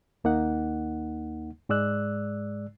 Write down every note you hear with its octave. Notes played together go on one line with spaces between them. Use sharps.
D#2 A#3 D#4 F#5
G#2 G#3 D5 E6 F#6